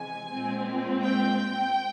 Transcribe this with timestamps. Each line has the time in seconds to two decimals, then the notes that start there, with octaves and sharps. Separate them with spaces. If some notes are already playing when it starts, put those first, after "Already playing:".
Already playing: C3 E3 G#3 G#5
0.32 A#2 G#3 C4
1.02 G5